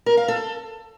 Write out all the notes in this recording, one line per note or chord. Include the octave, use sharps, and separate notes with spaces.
A#4
F5
A4